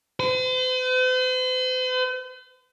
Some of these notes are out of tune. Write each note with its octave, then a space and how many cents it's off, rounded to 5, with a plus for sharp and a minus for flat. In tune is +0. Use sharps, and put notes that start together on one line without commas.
C5 -45